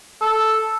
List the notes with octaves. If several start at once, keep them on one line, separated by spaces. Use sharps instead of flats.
A4